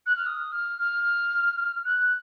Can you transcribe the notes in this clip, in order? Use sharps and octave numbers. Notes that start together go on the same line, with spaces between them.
F#6
F6
D#6
F6
F6
F#6